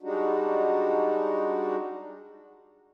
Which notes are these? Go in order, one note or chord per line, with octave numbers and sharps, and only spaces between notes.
G3 G#3 D4 D#4 F#4